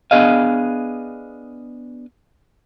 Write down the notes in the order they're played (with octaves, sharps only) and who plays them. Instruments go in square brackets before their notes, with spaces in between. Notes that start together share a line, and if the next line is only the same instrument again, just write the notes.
[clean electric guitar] B3 D4 G#4 D#5 F5